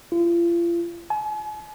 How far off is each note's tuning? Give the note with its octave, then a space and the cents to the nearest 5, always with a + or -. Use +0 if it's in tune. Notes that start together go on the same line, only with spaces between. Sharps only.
F4 -40
G#5 +45